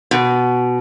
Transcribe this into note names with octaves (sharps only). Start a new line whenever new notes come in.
B2